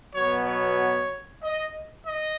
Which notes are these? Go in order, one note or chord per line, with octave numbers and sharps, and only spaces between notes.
B2 F#3 B3 C#5
C#5
D#5
D#5